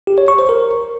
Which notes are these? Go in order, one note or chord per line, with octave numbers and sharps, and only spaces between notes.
G4
C#5
C#6
C5
A#4